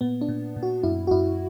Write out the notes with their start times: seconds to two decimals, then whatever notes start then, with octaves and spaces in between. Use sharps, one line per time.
0.01 A#2 B3
0.21 D4
0.29 A#2
0.56 A#2
0.63 F#4
0.83 F#2 E4
1.07 F#4
1.11 F#2 E4